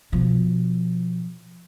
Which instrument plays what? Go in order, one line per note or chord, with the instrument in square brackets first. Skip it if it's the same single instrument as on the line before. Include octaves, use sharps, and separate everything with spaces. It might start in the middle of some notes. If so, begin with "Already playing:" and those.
[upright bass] B2 F3